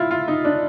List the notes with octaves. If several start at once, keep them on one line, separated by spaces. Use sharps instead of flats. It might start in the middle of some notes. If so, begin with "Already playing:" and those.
Already playing: E4 F4
F4
D#4
D4